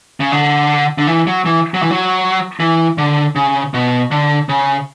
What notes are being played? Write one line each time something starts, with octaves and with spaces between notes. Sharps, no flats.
C#3
D3
D3
E3
F#3
E3
F#3
E3
F#3
E3
D3
C#3
B2
D3
C#3